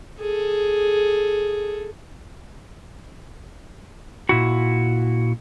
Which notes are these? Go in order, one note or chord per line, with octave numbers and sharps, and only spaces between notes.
G#4 A4
A#2 E4 F#4